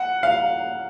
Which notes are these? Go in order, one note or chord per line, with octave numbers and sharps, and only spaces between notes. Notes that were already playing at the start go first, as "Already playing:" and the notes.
Already playing: F#5
F5